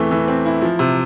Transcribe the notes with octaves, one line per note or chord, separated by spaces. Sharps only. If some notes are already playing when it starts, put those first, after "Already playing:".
Already playing: E2 E3 A3 C4
E3
C4
E4
F3
C3